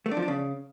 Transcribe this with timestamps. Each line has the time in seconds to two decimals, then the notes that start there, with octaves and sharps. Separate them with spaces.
0.06 A3
0.11 D4
0.17 F3
0.22 D4
0.28 C#3